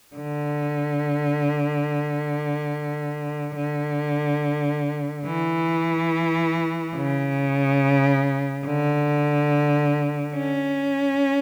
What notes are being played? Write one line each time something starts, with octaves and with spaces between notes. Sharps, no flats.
D3
D3
E3
C#3
D3
C#4